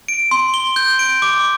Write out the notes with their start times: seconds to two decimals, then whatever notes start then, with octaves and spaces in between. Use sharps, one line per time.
0.08 D7
0.31 C6
0.54 G7
0.76 G6
0.99 D7
1.22 D6